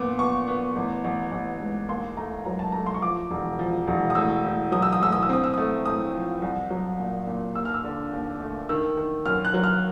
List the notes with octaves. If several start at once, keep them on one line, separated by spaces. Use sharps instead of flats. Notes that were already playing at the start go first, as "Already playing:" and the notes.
Already playing: A#2 B3 D6
B3 C#6
B3
A1
A1
A1
G#2
D#2 C6
A3 A#5
F#3 A#5
A5
A3 A#5
C6
C#6
F3 D6
E1
F3
E1
D#6
A2 E6
A2
F#3 D#6
E6
D#6
A2 E6
D#6
E6
C4 D#6
E6
A3 D#6
A2 D#6
F3
C2
F#3
A#2
A#2
D#2 E6
F6
E6
D3
D#2
A3
D#3 E6
D#3
F#2 F6
F#6
F#3
F6